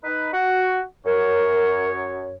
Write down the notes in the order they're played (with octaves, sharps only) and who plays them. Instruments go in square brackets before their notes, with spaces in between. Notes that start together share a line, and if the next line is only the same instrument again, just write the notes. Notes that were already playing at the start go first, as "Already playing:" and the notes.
[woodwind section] D#4 B4
F#4
[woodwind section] F#2 C#5 [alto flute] A#4